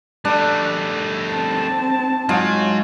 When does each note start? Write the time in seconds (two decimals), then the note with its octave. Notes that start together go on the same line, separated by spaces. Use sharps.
0.25 G3 A3 D4
1.32 C4 A5
2.29 G#2 F#3 F4